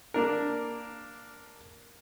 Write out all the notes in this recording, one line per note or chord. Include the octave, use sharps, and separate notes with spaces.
A#3 D4 A#4